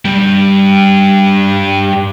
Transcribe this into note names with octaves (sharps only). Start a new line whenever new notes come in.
G2 G3